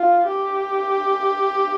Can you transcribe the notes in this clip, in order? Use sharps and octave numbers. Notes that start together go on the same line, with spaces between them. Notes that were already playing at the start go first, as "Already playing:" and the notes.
Already playing: F4
G4